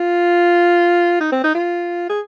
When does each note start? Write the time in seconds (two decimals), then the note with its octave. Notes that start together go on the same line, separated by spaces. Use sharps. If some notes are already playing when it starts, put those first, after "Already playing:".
Already playing: F4
1.21 D#4
1.32 C4
1.44 D#4
1.55 F4
2.09 G#4